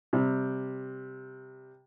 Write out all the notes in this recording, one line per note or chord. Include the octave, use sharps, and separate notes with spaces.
C3 G3